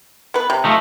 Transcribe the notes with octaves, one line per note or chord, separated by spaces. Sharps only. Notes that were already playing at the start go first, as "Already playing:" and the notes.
B3 B4
C3
F3 A3 D#4